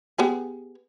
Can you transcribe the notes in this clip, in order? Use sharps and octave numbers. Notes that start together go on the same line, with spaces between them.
B3 G4 G#4